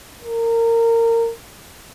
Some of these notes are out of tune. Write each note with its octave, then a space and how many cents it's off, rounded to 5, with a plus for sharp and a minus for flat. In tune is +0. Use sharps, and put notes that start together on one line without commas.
A#4 -25